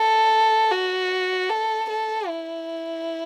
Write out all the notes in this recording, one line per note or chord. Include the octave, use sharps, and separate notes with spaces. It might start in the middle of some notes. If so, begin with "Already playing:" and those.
Already playing: A4
F#4
A4
A4
E4